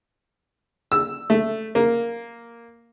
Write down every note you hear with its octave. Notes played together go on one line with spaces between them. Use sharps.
E6
A3
A#3